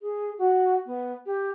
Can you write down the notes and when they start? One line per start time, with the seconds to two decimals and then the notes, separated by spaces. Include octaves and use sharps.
0.02 G#4
0.38 F#4
0.86 B3
1.26 G4